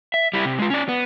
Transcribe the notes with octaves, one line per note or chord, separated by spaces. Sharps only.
E5
G3 E4
C3
G#3 F4
C#4 D5
B3